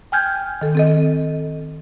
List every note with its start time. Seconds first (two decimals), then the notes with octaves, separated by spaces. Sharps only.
0.12 G5 G#5 F6 G6 G#6
0.61 D#3 A4
0.75 C4 A4 D#5